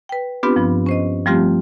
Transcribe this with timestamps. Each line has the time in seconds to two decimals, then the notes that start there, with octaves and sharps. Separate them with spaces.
0.09 B4 G5
0.43 B3 C4 D4 F4 G4 B4
0.56 G2 F3
0.86 C#4 C5 D#5
1.26 F3 G3 A3 C4 F4 G4